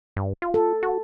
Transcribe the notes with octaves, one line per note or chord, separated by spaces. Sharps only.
G2
F4
A4
F#4